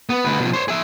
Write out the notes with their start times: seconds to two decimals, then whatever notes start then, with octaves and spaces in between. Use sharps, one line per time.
0.10 B3
0.25 D2 B4
0.40 B2 F3
0.53 C5 C#5
0.68 G#4 E5